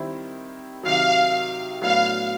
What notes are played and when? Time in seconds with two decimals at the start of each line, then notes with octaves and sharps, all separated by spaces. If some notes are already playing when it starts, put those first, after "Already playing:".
Already playing: D#3 G3 C4 E4
0.83 C3 D#3 F#3 F5
1.81 A2 F#3 B3 D4 F5